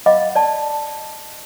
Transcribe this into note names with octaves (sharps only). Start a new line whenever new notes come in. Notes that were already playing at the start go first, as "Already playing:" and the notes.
D#5 F5 F#5 B5 D6
D5 A5